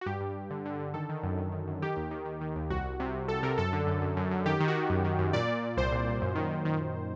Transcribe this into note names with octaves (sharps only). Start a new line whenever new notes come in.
F#4
G2 G4
G2
G2
D3
D3
D3
D#3 A4
D#3
F#2
D#3
D#3
F#2
D#3 G4
D#2
D#3
D#3
D#3
D#2
C2 F#4
C2
C3
C2
C2 A4
C3 A#4
F#2 A4
D3
F#2
F#2
F#2
F#2
D#3 G4
D#3
F#4
D#3
F#2
D#3
F#2
A#2 D5
A#2
A#2
C2 C5
A#2
A#2
F#2
D#3
D#3
D#3
D#3